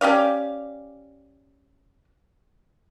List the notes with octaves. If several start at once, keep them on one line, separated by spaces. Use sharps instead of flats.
C#4 G4 D5 F5